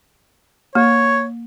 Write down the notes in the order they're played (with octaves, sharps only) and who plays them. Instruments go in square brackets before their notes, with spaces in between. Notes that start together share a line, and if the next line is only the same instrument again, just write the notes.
[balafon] A#3 [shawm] C#5